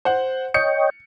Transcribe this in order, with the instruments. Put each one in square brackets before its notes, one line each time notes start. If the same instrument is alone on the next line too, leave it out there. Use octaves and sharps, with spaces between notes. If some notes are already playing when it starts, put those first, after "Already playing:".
[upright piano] C5 F#5
[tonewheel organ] C#5 D#5 G5 [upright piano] C#7